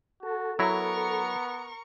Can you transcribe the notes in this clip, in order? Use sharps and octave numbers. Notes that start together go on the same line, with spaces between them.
F#4 A4
F#3 B3 E4 A#4 A#5 C#6